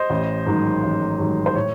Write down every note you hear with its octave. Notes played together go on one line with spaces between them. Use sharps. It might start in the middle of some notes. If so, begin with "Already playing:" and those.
Already playing: C5 D#5
A1
G#2 D#3 F#3
A1
G#2 D#3 F#3
C5
A2 C#5